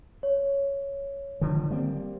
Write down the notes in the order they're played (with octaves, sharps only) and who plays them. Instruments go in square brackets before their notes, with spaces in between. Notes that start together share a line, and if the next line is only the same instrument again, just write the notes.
[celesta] C#5
[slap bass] D3 D#3 F3
G3 A#3 C4